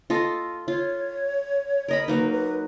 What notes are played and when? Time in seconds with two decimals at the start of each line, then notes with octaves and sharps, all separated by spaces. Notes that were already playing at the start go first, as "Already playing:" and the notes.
0.10 F4 A4 D#5
0.68 F4 C#5
1.88 A#4 D#5 B5
2.08 F#3 A#3 D#4 B4
2.31 B4